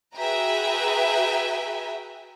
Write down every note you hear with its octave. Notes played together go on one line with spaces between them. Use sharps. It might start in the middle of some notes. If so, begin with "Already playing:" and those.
F#4 G#4 B4 E5 G5 A#5